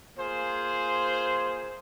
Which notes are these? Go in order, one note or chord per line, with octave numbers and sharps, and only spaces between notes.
A#3 F4 G#4 C5